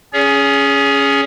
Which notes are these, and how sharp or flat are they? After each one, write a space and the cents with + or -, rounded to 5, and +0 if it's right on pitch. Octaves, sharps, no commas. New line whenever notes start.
C#4 +5 G#4 +0 C#5 +45